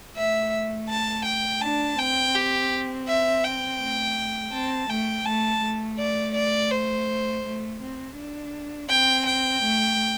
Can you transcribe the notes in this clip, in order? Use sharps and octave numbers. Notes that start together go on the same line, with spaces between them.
A3 E5
A5
G5
D4 A5
C4 G5
G4
E5
G5
A3
C4 A5
A3 G5
A3 A5
A3
D5
D5
C5
A3
C4
D4
C4 G5
G5
A3